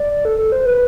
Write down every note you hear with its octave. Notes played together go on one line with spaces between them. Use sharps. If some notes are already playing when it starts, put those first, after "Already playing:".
Already playing: D5
A4
A4
C5
B4